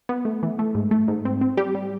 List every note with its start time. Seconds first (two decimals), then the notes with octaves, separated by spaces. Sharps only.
0.09 B3
0.25 A3
0.43 E3
0.59 A3
0.75 G#2
0.91 A3
1.08 G#2
1.25 C4
1.41 C4
1.57 G3 G4
1.75 G3